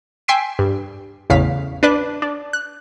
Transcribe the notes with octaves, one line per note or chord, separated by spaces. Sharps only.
G5 G#5 C6 E6 B6 D7
G2
A1 E2 C#3 F5 B6
D4 B4 D5 F#6
D4
F#6